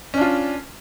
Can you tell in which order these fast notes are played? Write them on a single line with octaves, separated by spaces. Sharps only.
C#4 D4 F4